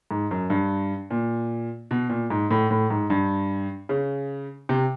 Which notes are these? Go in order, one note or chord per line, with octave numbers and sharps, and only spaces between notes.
G#2
F#2
G2
A#2
B2
A#2
G#2
A2
A2
G#2
G2
C#3
C3